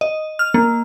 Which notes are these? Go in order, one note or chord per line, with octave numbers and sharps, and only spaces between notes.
D#5
F6
A#3